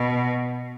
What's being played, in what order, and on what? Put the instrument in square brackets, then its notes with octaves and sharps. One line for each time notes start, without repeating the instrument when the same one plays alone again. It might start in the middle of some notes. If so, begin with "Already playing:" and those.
Already playing: [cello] B2